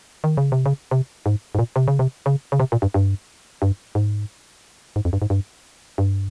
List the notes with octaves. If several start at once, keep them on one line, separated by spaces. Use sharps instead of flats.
D#3
C#3
C3
C#3
C3
G#2
G#2
A#2
C3
C#3
C3
C#3
C#3
C3
A#2
G2
G2
G2
G#2
G#2
F2
G2
G#2
G2
G2